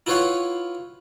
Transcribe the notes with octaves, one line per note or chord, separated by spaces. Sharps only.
E4 F4 B4 C#5 F5 F#5